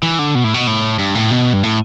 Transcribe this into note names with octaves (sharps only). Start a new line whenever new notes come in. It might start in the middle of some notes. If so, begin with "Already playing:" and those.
E3
D3
B2
A2
B2
A2
G2
A2
B2
G2
A2